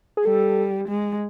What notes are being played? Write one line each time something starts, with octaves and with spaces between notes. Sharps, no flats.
G#4
G3 A4
G#3